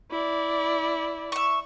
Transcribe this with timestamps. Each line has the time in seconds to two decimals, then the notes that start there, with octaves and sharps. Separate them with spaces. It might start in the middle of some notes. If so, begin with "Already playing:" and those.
0.11 E4 D5
1.32 E5 C#6